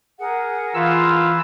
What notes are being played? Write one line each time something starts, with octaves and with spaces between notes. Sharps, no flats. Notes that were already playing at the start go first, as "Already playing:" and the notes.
G#4 A#4 F#5
E3 F4 E6